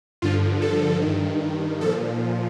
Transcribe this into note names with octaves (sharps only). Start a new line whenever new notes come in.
G2 D3 F3 F4
A4
G2 D#3
A#2 F3 A4